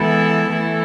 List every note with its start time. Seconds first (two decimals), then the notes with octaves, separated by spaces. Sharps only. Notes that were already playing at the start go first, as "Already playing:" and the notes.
Already playing: E3 G#3 B3 E4 A4
0.48 E3 A3 E4 A4